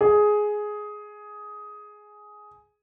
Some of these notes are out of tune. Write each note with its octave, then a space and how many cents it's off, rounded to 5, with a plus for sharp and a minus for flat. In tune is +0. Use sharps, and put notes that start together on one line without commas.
G#4 +10